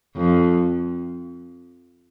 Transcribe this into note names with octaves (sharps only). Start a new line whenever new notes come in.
F2